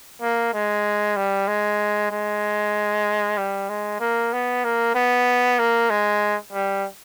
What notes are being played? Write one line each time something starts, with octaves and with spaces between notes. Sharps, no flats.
A#3
G#3
G3
G#3
G#3
G3
G#3
A#3
B3
A#3
B3
A#3
G#3
G3